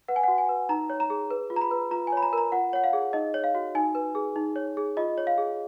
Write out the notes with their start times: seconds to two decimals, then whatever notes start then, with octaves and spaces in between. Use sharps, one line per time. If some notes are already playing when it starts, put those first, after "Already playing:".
0.08 B4 F#5
0.16 G#5
0.23 F#4 F#5
0.38 G#5
0.49 B4
0.69 D#4 A#5
0.90 C#5
1.00 A#5
1.10 G#4
1.31 B4
1.50 F4
1.56 A#5
1.61 B5
1.71 B4
1.91 F4 A#5
2.07 G#5
2.12 C#5 B5
2.22 A#5
2.33 A#4 A#5
2.52 F4 F#5
2.73 C#5 F#5
2.84 F5
2.93 G#4
3.13 D#4 D#5
3.34 C#5
3.44 F5
3.55 F#4
3.75 D#4 G#5
3.95 B4
4.15 G#4
4.36 D#4
4.56 C#5
4.77 G#4
4.97 F4 D#5
5.18 C#5
5.27 F5
5.38 G#4